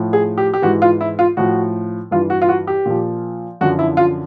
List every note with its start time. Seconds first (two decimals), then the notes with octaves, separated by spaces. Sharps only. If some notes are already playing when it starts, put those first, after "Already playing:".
Already playing: A2 F3
0.13 G#4
0.38 G4
0.54 G4
0.62 G#2 E3 F#4
0.82 F4
1.01 E4
1.19 F4
1.37 A2 F3 F#4
2.11 G2 E3 F4
2.30 F#4
2.42 F4
2.49 F#4
2.67 G4
2.86 A#2 F3
3.61 F#2 D3 F3 F#4
3.79 E4
3.97 F4